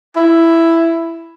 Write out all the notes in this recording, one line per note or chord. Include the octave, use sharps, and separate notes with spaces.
E4